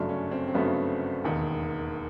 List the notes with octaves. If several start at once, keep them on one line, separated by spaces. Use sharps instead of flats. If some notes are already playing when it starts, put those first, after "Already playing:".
Already playing: G1 F#2 C#3 F#3 A3 D4
C#4
C4
C4
G1 F#2 C#3 F#3 A3 B3
E1 D#2 D#3